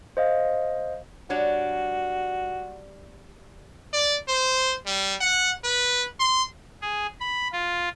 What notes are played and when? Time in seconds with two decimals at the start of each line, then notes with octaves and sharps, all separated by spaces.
0.17 C5 D#5 F5
1.30 G3 D4 F#4 C#5
3.93 D5
4.28 C5
4.86 G3
5.21 F#5
5.64 B4
6.20 C6
6.82 G#4
7.20 B5
7.52 F4